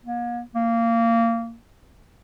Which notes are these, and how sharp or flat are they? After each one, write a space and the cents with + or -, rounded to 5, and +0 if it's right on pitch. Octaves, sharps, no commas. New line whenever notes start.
A#3 +40
A#3 -20